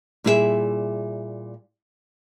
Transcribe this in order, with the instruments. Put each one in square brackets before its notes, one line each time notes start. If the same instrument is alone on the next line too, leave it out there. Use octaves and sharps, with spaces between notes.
[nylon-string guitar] A#2 G3 E4 G#4 A#4 E5